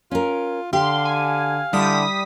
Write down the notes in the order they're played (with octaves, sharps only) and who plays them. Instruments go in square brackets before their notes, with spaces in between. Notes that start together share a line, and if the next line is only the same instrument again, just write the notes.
[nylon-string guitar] C#4 A#4 [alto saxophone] F4
[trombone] D3 [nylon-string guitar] G4 [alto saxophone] F5 [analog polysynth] C6
[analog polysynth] G#5
[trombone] D3 [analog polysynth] G3 D#6 B6 [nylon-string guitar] E4